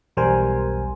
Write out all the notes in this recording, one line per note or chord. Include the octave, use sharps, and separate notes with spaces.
B1 E2 G3 A#4 C5 G#5